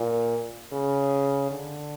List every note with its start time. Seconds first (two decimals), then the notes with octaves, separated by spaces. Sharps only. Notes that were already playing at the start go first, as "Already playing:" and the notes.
Already playing: A#2
0.72 C#3
1.51 D3